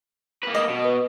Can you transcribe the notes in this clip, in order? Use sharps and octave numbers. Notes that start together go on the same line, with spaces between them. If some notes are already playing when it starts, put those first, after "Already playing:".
A#3 B4
D#5
B2
B4